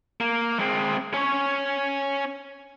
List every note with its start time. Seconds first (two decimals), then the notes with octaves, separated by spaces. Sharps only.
0.20 A#3
0.59 G#3 C4
1.14 C#4 C#5